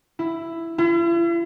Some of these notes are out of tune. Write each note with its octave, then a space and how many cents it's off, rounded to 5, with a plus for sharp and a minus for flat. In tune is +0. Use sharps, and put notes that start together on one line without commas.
E4 +10
E4 +45